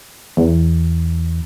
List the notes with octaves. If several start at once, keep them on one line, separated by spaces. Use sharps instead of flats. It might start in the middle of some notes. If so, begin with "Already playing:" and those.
E2